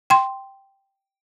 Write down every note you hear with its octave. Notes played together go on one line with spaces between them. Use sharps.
G5 C6